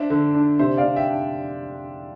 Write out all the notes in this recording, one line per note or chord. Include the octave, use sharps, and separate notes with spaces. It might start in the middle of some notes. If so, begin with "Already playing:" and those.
Already playing: D4 C5 E5
D3
D4
C3 C5 E5
D5 F5
C3
E5 G5
D4